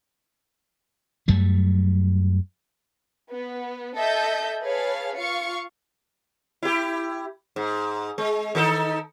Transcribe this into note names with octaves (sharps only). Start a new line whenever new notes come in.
F#2 F#3 G3 A3
B3
A4 D#5 E5 G6
G#4 B4 C#5 F5 A5
F4 F5 C#6 C#7
E4 G4
G#2
G#3
D#3 D#4 A4